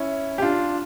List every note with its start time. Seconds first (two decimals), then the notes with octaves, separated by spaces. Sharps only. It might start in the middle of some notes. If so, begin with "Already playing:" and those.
Already playing: C#4 E4
0.38 G4
0.42 D4 F4